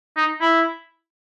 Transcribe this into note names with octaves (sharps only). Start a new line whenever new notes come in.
D#4
E4